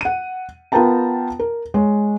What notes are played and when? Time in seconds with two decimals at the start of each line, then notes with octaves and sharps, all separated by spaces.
0.01 F#5 D#7
0.72 B3 F4 A#4 G5 A5 A#5
1.39 A#4
1.74 G#3 C#5